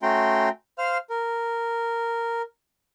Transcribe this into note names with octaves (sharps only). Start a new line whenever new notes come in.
A3 C#4 F#4 G5 A#5 C6
C5 F5 F6
A#4